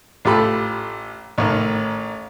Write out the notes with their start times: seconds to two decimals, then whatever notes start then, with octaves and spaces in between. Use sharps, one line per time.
0.25 A1 F4 G4 A4 B5
1.38 A1 A2 D#3